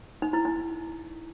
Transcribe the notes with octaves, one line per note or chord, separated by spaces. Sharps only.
D#4
E4
D#4